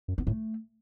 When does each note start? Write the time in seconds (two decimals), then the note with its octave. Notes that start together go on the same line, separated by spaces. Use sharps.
0.08 F#2
0.18 B3
0.27 A2 A3